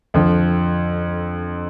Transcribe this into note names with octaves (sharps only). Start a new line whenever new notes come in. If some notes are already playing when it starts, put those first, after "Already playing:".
F2 D3 F3